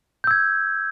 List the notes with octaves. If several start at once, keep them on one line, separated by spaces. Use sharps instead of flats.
E6 G6 G#6